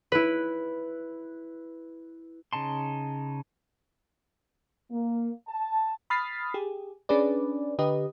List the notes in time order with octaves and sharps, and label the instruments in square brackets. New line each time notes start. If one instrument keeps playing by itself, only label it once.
[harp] E4 B4
[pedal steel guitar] C#3 D#4 A5 C6
[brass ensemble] A#3
A5
[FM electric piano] B5 D#6 F6 A6 B6 C7
G4 G#4
C#4 D4 G#4 B4 D5
D3 G4 B4 D#5